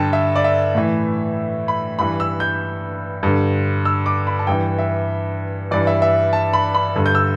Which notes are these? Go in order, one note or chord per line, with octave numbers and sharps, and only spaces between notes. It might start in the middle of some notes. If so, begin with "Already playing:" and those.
Already playing: G2 D3 G5 A5
E5
D5
E5
A2 E3
B5
G2 E3 B5
E6
G6
G2 D3
E6
D6
B5
A5
G2 E3 G5
E5
G2 E3 D5
E5
E5
A5
B5
B5
G2 D3
G6
E6